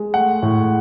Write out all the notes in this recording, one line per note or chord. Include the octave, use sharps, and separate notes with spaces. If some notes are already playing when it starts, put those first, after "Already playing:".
Already playing: G#3
A3 F#5
A2